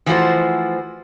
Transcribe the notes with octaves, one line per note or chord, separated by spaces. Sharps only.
E3 F3 A3 F#4 C5